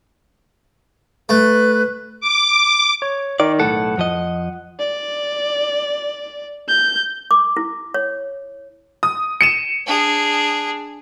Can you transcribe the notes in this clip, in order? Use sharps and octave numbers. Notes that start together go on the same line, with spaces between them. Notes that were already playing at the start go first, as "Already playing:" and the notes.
A3 B4
D6
C#5
D#3 D5
B1 A2 A4 F#5
F2 F3 D#5
D5
G6
D6
E4
C#5
D#6
C#7 D#7 E7
D4 G#4